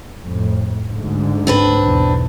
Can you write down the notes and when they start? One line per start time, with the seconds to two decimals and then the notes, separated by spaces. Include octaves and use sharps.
0.22 F2 A2
0.90 D2 G#2 D3
1.47 C4 D4 B4
1.82 B1 E2